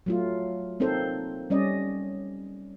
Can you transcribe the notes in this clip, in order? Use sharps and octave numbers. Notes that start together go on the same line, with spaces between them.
F#3 A3 F4
A#3 C4 D#4 A4 C5
G3 C#4 D5 D#5